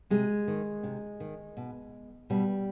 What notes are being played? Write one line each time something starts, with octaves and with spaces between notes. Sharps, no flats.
C3 G#3
D#3
C3
D#3
B2
B2 G3